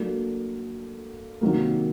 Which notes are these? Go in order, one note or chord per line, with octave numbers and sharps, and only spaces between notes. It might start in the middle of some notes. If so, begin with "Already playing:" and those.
Already playing: F#3 A#3 D4 F#4 A4
C3 D#3 F#3 A#3